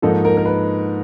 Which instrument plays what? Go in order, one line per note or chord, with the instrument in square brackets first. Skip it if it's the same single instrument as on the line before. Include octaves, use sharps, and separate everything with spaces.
[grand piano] G#2 F3 A#3 D#4 A4
A#4
A#4
B4